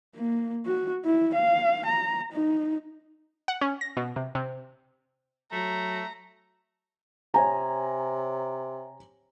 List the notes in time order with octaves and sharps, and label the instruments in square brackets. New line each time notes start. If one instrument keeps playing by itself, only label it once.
[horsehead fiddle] A#3
F#4
E4
F5
A#5
D#4
[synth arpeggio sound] F#5
C#4
A#6
B2
C3
C3
[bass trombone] F#3 [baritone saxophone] A3 [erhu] A#5
[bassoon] C3 [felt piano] C#5 G#5 A#5